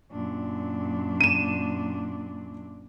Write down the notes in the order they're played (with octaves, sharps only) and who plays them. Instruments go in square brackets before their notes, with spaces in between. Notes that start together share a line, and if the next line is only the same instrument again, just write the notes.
[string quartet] F#2 A#2 D4
[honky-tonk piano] D#7 E7